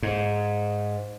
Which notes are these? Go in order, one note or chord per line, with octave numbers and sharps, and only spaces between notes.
G#2